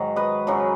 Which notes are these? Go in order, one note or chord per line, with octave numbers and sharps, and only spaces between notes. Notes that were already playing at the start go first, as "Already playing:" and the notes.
Already playing: G#2 D#3 F#3
B4 D#5
F#2 C#3 F#3